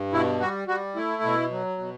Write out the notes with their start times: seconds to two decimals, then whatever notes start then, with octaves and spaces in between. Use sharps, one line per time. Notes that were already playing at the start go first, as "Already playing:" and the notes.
Already playing: G2
0.13 B2 E4
0.40 G3 F#4
0.68 G3 F#4
0.96 A3 E4
1.23 B2
1.51 F#3
1.78 B2